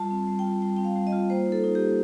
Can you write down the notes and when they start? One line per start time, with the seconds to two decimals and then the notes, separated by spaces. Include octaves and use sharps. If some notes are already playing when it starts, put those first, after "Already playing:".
Already playing: G3 F4 A5
0.11 C4
0.27 G3
0.39 G5
0.44 F4
0.62 G3 G5
0.77 C4 G5
0.85 F5
0.96 G3
1.07 D#5
1.12 F4
1.30 A#3 C5
1.47 D#4
1.52 A4
1.64 D#4
1.75 G4
1.80 A#3